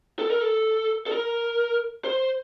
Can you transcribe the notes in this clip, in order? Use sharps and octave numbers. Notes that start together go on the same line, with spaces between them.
A4
A#4
A4
A4
A#4
C5